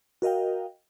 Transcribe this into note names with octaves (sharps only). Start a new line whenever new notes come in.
F#4 A#4 D#5 F5 G5